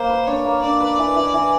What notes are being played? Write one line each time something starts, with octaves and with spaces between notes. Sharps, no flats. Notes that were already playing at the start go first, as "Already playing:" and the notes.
Already playing: A#3 C5
B4
D4 C#5
A#3
D4 D5
B4
E3
E3
E3